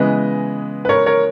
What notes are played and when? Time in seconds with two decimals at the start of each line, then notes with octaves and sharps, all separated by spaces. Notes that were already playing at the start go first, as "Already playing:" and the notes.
Already playing: C#3 E3 G#3 B3 B4 D#5
0.85 B4
0.89 A#4 C#5
1.06 A#4 C#5